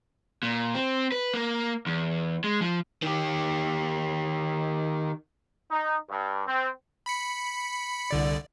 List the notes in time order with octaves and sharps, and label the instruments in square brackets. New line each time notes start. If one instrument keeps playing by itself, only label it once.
[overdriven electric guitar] A#2
C4
B4
A#3
E2
G#3
F3
D#3 G4
[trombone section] D#4
G2
C4
[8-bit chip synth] B5 B6 C#7
C2 D3 D5